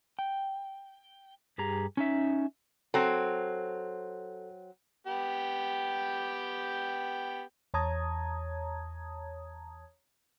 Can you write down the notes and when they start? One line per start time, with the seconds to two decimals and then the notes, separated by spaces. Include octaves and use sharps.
0.19 G5
1.58 G2 G4 G#4 A#5
1.97 C#4 D#4 E5
2.94 F#3 C4 A4
5.07 B3 G4 G5
7.74 E2 C#5 A5 A#5 D#6 G#6